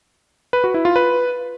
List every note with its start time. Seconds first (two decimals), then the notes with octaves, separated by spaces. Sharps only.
0.53 B4
0.64 F#4
0.74 E4
0.85 F4
0.96 B4